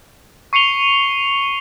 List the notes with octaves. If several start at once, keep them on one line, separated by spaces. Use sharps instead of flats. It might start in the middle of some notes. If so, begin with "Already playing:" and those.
C#6 C7 C#7 D#7 F7 G7